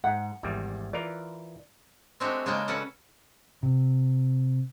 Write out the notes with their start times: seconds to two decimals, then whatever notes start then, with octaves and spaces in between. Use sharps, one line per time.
0.04 G#2 F#5
0.43 G#1 E2 G3
0.93 E3 F4 A#4 D5
2.20 G#3 A3 C4 D4 F#4 G4
2.46 C#3 G#3 A#3 D4 G5 A5
2.68 C#4 F#4 A4 B4 F#5
3.63 C3